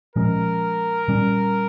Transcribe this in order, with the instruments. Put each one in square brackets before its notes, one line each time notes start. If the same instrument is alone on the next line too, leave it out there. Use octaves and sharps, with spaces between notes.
[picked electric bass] A#2 F3 G#3 C#4 [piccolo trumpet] A#4
[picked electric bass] A#2 G3 C#4